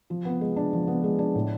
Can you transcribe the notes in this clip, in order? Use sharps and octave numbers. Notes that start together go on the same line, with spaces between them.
F3
B3
G#3
D4
F3
B3
G#3
D4
A2